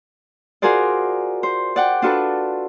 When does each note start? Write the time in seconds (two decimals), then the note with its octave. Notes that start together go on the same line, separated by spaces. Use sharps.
0.62 F4 F#4 G#4 A#4 C5 D5
1.43 C5
1.76 D5 F#5 G5
2.02 D4 F4 F#4 A4 B4